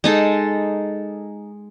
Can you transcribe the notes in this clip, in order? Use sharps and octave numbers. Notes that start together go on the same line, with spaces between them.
G#3 D#4 A4